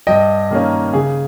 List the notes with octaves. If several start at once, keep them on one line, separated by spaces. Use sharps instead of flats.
G2 D#5 G5
D#3 A#3 C#4
C#3 G#4